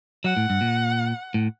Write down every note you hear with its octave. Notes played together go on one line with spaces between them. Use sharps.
F#3 F#5
A2
G2
A#2
A2